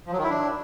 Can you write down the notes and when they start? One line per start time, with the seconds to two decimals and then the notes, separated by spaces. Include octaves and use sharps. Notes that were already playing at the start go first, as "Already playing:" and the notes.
0.06 F3
0.12 F#3
0.18 D#3
0.24 E4
0.30 D4